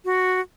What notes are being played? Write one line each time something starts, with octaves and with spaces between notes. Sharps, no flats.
F#4